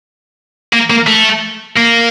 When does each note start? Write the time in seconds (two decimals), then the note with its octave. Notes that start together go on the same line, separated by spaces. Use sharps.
0.73 A#3
0.90 A#3
1.07 A3
1.76 A#3